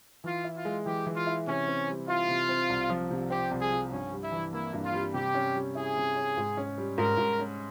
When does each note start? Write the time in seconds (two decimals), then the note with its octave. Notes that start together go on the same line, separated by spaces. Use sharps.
0.24 E3 F4
0.44 E4
0.55 F4
0.65 G#3
0.86 E3 G4
1.06 E3
1.16 F4
1.26 E4
1.47 C3 C#4
1.67 C4
1.88 G3
2.08 E4 F4
2.28 C3
2.49 C4
2.69 C2
2.89 F3
3.11 C3
3.30 C4 G4
3.51 C2
3.61 G#4
3.72 F3
3.91 G2 C#4
4.12 G3
4.23 E4
4.32 E3
4.53 A#3 E4
4.73 G2
4.84 F4
4.94 G3
5.14 C3 G4
5.34 C#4
5.55 G3
5.75 E4 G#4
5.96 C3
6.16 C#4
6.37 G#2
6.57 C#4
6.78 G3
6.98 G#2 A#4
7.18 G#2
7.39 C#4